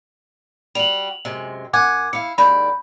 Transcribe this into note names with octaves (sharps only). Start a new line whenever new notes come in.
G3 F#4 F7 F#7
F#2 C3 G#3
F#2 F#5 G#5 D6
E4 F5 C#7
D#2 G#2 D5 B5 G6